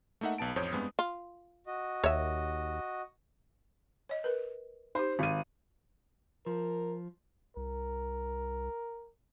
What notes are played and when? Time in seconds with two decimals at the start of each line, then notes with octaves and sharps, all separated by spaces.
0.21 A3 A#3 D#4 E5 F#5
0.38 B1 B3 A5 D7
0.56 A1 F2 C5 C#5 D#6 G6
0.72 G2 G#3 B3 C4
0.99 F4
1.67 F#4 D#5
2.04 D#2 C#5 E5
4.09 C#5 D#5
4.24 A#4 B4
4.95 D#4 G4 C5
5.19 G#1 D#7
6.46 F3 A#4
7.57 C2 A#4